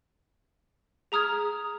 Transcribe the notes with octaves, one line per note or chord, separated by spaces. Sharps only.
G#4 A#5 D#6 F6 G#6